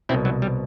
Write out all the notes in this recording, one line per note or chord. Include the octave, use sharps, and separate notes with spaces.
C2 B2 C4 E4
F#3
G3